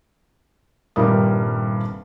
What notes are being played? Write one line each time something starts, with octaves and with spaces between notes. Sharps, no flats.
D#1 G2 C3 G3 A#4 D#6